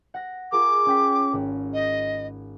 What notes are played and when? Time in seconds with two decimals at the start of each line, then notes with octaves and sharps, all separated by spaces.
0.14 F#5 A#6
0.52 F4 G#4 A#4 D6
0.86 C#4 G5 B6
1.33 G#1
1.74 D#5